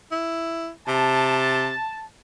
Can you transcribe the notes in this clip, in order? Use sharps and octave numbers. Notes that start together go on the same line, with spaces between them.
E4
C3 A5